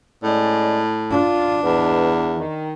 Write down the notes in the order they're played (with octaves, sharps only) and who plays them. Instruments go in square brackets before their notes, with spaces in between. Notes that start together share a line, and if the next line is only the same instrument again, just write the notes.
[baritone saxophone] A2 [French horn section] G#3 C#4 D5
[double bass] D4 [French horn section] F4
[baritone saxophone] E2 [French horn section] G#2 B4
[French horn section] D#3